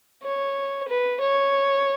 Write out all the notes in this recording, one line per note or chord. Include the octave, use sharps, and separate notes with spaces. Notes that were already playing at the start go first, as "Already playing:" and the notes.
C#5
B4
C#5